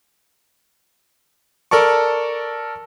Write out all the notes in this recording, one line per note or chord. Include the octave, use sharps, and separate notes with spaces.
A4 A#4 D5 A5 C#6